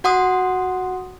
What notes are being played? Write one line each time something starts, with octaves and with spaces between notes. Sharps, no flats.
F#4 F#5 C6 D#6